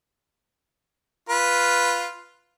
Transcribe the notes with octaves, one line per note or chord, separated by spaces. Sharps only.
F4 B4